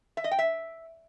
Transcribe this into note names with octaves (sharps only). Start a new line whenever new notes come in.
E5
D#5
G5
E5